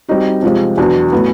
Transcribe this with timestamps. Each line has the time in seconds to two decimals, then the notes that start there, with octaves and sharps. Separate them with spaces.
0.08 G3 C4 D#4 F#4
0.43 C3 F3 G#3 C4 F4
0.77 E2 B2 F#3 B3 D4
1.12 A2 F#3 B3